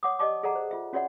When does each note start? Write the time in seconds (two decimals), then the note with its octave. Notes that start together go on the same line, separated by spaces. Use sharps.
0.03 C#5 F#5 D6 D#6
0.19 G4 D5 D#5 A5 C#6 D6
0.43 G#4 A4 D5 F#5 A#5
0.55 C5
0.71 F4 E5
0.93 C#4 F#4 C#5 D5 E5 F#5